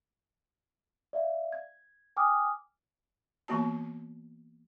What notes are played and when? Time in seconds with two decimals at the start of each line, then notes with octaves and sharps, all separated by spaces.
1.13 D5 E5 F5
1.52 G#6
2.17 G5 G#5 D6 D#6 F6
3.48 E3 A#3 B3 F#4 A5